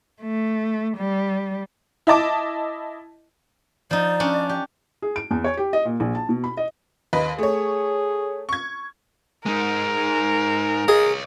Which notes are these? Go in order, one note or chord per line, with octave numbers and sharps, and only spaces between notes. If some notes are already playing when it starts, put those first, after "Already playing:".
A3
G3
E4 D#5 A5 D6
F3 D#4 D5
C#4 D4
G4
G#4
D7
E2
C#5
G4
D#5
A#2
A#1
A5
B2
B5
D#5
D#2 B4 D#5
A3 G#4 C#5
C#6 G#6
G#3 D#4 A#4
G#4 C#5 D#5